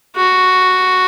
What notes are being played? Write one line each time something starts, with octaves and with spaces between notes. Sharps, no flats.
F#4